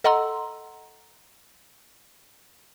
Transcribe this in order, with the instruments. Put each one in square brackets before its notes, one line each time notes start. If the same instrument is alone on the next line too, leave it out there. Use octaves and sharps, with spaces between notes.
[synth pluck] A4 D#5 F#5 A#5 C6 E6